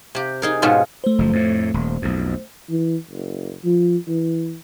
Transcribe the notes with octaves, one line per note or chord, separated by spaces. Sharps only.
C3 G4
D#4 G#4 A#4
G#2 B2 C#4 F4
A3 C5
F#1 F3
F2 A2
D#1
B1 F2
E3
F#1
F3
E3